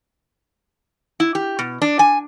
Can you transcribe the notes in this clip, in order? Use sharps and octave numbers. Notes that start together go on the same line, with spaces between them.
E4
G4
B2
D4
G#5